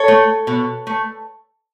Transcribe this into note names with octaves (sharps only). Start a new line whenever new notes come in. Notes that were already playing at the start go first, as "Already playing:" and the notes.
Already playing: A4 C#5
A3
B2
A3